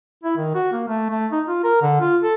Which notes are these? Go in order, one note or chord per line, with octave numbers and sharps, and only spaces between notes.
E4
D#3
F#4
A#3
A3
A3
D#4
F4
A#4
D3
F4
A4